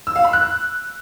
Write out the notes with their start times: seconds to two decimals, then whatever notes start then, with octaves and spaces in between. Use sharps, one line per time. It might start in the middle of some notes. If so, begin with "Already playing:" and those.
0.07 E6
0.16 F5
0.24 B5
0.33 F#6